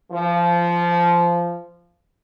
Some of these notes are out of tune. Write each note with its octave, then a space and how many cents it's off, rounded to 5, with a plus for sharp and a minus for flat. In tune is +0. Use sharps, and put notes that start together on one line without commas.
F3 -15